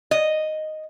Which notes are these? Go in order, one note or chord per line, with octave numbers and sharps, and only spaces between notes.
D#5